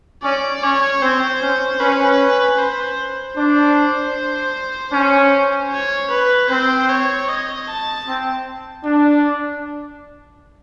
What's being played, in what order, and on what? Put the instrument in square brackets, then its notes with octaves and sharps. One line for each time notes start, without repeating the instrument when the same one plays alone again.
[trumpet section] C#4 [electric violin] D5
[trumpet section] C#4 [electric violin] C#5
[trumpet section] C4 [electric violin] C5
[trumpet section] C#4
[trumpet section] C#4 [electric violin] B4
[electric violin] C5
[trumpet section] D4 [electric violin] C5
[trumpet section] C#4
[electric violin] C#5
B4
[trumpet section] C4 [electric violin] C5
[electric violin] C#5
D#5
A5
[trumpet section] C4
D4